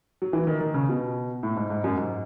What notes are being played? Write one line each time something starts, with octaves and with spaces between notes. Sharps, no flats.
F#3
E3
D#3
D#3
C#3
B2
A2
G#2
G#2
F#2
G#2